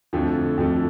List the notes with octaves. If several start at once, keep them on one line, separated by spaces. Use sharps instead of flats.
F2 D3 F3 A3
F2 D3 F3 A3